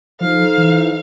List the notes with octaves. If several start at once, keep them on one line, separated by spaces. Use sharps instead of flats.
F3 D#4 A4 C5 F5
E3